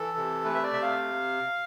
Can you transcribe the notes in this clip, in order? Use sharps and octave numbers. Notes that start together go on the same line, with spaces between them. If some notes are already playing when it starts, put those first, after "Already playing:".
Already playing: E3 A4
C3
A3 B4
E5
D5
C3 E5
F5